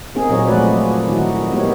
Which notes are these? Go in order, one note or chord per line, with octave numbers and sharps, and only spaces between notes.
A#3 C4 D#4 G#4
A#2 F#3 C4 G#4 C#5 D#5
F3 G#3 A3 F#4 B4 D5
F#3
D#3 D#4 E4 F#4
G#3 B3 D#4 G4 A#4 C#5